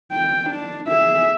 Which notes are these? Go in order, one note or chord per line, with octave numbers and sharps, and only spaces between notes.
G5
D4
G#4 E5